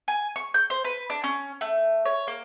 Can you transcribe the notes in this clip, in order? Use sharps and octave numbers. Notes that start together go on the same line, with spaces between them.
G#5
C#6
G6
C5
B4
D4
C#4
A3
C#5
A#3